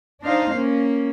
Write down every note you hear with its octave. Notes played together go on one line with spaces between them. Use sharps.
D4 D#4 C5 F5
A#3 C#4